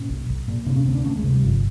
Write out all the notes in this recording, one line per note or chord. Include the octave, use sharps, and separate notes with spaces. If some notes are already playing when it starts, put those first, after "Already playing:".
Already playing: A#2 C#4
B1
B1
A#2
C3 D4
C#4
D2 C4
D4
D2 C#4
G#3
C3
G3
G1 F3